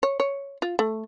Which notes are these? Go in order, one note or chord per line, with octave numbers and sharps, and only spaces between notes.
C#5
C#5
F4
A3